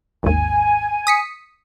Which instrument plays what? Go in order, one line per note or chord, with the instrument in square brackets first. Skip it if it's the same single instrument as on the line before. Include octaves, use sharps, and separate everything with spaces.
[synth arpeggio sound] G#1 D#2 [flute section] G#5
[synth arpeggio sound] D#6 B6 C#7